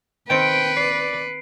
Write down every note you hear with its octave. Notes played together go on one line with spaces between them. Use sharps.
D#3 C4 B4 G5 C#7 D7
D5 C7